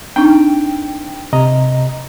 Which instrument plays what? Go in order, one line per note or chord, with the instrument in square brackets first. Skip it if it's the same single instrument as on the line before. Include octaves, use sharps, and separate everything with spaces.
[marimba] C4 D4 D#4 [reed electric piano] G5
[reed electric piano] C3 D#5 A#5